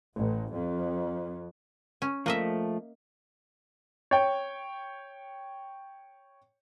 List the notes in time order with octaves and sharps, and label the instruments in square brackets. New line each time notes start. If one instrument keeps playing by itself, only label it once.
[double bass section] A1
F2
[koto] C#4
[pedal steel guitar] F3 A3 [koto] A#3 D#5 E5
[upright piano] C#5 G5